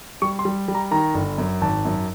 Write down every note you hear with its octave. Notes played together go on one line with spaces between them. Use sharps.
G3 C#6
C6
G3
G3
A#5
D#3 A#5
G1
F#2
G#1 A5
F#2